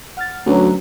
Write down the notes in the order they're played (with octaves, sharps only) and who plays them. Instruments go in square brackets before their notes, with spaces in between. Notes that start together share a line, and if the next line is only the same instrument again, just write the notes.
[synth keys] F#5 F6 A6
[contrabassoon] D2 [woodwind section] F#3 [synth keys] C#4 F#4 B4